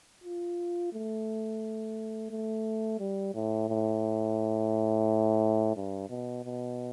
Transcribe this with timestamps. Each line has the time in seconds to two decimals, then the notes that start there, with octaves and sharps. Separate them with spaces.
0.24 F4
0.93 A3
2.31 A3
2.99 G3
3.35 A2
3.69 A2
5.76 G2
6.10 B2
6.45 B2